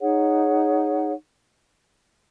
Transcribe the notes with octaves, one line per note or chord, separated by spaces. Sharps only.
D#4 G#4 C#5 F#5